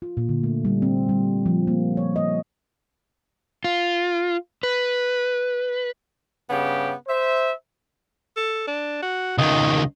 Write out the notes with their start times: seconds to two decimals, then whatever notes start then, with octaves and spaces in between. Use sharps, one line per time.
0.02 F4
0.17 A#2
0.29 D3
0.43 A3
0.65 G3
0.82 C4
1.09 G3
1.46 F3
1.67 A#3
1.97 C#5
2.16 D#5
3.64 F4
4.63 B4
6.50 G2 C#3 B3 G4
7.08 C5 E5
8.37 A4
8.67 D4
9.02 F#4
9.38 C#2 D#3 D#5